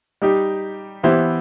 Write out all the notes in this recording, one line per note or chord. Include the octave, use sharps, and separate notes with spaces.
G3 D#4 G4
E3 B3 E4 G4 C5